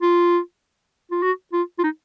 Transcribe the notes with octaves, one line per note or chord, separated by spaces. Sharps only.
F4
F4
F#4
F4
F4
D#4